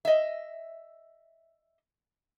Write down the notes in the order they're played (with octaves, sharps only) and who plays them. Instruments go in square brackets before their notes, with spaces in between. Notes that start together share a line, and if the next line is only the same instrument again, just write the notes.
[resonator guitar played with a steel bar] D#5 E5